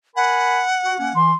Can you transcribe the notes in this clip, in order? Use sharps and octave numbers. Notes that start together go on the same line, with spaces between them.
A#4 F#5 G#5 B5
F#4
A#3 C#4
E3 C6